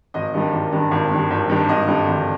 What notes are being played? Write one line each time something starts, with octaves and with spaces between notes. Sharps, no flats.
G#1 D#5
G2 D#3 G3
G#1
G2 D#3 G3
G#1
G2 D#3 G3
G#1
G2 D#3 G3
G#1 D#5
G2 D3 G3
G#1